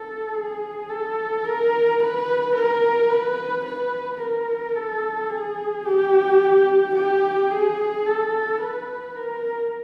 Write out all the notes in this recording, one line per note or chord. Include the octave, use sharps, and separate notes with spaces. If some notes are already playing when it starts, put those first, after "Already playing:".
Already playing: A4
G#4
A4
A#4
B4
A#4
B4
B4
A#4
A4
G#4
G4
G4
G#4
A4
B4
A#4